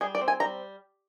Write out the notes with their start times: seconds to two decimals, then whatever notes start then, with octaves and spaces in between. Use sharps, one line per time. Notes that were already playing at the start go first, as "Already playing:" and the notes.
0.01 G3 G#4
0.15 D5
0.21 C4
0.28 G#5
0.40 G3 A#5